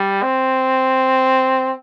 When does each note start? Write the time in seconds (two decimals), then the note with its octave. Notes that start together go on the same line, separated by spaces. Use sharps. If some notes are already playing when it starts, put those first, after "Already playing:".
Already playing: G3
0.23 C4